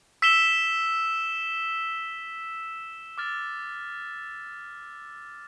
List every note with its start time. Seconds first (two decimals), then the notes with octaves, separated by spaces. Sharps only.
0.22 E6 B6 E7 G7
3.18 D6 F6 A6